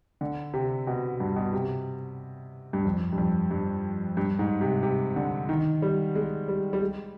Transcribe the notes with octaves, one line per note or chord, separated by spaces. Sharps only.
D3
C3
B2
G2
B2
C3
G2
F2
G2
F2
G2
G2
G#2
C3
C3
D3
D#3
G3
G#3
G3
G3
G#3